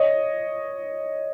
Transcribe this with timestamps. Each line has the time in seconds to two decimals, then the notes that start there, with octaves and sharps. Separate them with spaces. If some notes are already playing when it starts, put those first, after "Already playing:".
Already playing: C#5 D#5